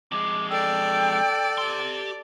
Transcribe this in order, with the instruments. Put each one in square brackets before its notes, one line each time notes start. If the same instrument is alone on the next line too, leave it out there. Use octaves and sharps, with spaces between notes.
[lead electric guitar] F2 G#3 [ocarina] D6
[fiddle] A4 D5 [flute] G5 [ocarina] E6
[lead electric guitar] G4 C6